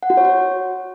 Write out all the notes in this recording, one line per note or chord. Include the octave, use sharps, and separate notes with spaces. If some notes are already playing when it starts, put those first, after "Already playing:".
F#5
F#4
C#5
F#4